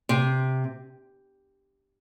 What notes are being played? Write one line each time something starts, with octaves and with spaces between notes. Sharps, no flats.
C3